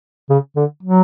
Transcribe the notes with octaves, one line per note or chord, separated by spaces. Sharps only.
C#3
D3
F#3